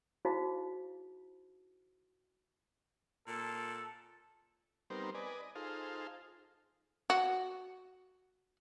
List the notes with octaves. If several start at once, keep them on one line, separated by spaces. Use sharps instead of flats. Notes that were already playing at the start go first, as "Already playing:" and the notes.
D#4 E4 F#4 G#4 C5 F5
A#2 A4
G3 B3 C4 D#4 A#4 C5
B4 D5 D#5 G#5
D#5
D#4 F4 G#4 A4 C5 F5
F#4